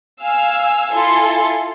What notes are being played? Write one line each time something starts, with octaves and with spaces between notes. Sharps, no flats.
F5 G#5 E6 F6
E4 F4 A4 G#5 C6